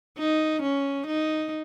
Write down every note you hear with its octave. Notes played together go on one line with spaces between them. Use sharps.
D#4
C#4
D#4